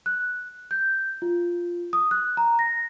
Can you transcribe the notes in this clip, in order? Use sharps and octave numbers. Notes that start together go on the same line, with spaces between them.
F#6
G6
F4
D#6
F#6
A#5
A#6